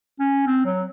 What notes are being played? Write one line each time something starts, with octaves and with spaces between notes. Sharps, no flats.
C#4
C4
F#3